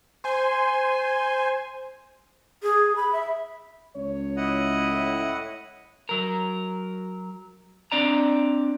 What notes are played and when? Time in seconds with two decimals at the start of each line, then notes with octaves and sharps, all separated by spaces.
0.24 C5 G#5 C6
2.63 G#4
2.96 B5
3.13 E5
3.95 C#2 C#5
4.37 E4 D#5 F#5
4.88 A2
6.09 F#3 A#4
7.92 C4 D4 D5 A#5